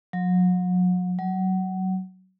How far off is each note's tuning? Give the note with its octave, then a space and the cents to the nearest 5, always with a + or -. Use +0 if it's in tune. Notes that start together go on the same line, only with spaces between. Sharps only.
F#3 -40
F#3 +20